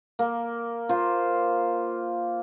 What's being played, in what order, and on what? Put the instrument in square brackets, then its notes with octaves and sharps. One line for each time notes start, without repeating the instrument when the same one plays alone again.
[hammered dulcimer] A#3
F4 C5